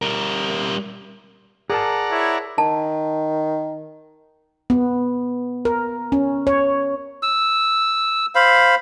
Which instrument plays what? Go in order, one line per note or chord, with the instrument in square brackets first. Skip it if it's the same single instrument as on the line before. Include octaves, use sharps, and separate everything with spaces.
[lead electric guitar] G3 A#4
[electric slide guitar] G#4 A#4 A5 [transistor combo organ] D5 F#5 A#5
[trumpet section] E4 C#5
[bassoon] D#3 [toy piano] A5
[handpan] B3
A#4
C#4
C#5
[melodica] E6
C5 F5 B5